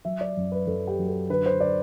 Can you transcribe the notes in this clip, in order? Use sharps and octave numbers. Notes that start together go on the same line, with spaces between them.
F#3 E5
D5
F#2
B4
F#2 A4
G4
F#3
A4
D3 B4
C5
D5